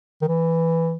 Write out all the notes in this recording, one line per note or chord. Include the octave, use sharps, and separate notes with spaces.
D#3
E3